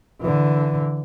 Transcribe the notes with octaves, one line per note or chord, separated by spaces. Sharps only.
D3 E3